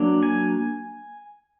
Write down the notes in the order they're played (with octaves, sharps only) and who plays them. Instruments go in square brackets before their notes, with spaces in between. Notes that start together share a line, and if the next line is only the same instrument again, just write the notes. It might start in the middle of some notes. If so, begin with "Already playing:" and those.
Already playing: [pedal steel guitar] F#3 A#3 D4
G#5